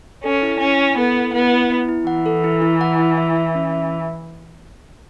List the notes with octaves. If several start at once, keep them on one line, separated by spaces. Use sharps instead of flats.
C#4 A4
E4
C#4 E4
E4
B3 A4
E4
B3 E4
E4
E4
E4
E3 F#5
A4
E4
E4
F#5
E4
E5
E5
C#4
E5